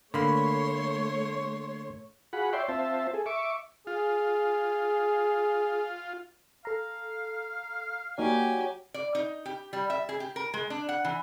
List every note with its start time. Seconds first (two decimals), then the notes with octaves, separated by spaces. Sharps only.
0.14 D3 A3 A#3 C#5 B5 C6
2.33 F4 F#4 G#4 F#5 B5
2.53 C#5 D5 E5 G5 C6
2.69 C4 F4 C5 E5 A5
3.14 G#4 A4
3.26 E5 C#6 D6
3.87 F4 G#4
6.65 A4 F5 A#5
8.18 F#3 A#3 D#4 G4 D5 G#5
8.94 D5
9.15 D#4
9.46 G4
9.73 G3
9.90 E5
10.09 G#4
10.20 G4
10.36 A#4
10.54 G#3
10.70 D4
10.89 F#5
11.05 E3